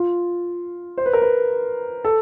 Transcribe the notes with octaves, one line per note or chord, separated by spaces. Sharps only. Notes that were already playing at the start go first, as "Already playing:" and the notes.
Already playing: F4
C5
B4
A#4
B4
A4